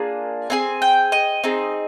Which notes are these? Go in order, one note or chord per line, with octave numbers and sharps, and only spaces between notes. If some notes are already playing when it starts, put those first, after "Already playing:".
Already playing: A#3 D4 F4 G#4
C4 D#4 G#4 G#5
G5
D#5
C4 D#4 G#4